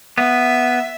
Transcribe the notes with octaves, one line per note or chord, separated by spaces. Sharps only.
B3 E5